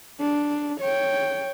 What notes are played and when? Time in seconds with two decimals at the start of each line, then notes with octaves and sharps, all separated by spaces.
0.20 D4
0.81 C#5 G5